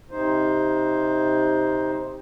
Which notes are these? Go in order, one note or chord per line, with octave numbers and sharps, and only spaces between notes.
C3 D#4 C5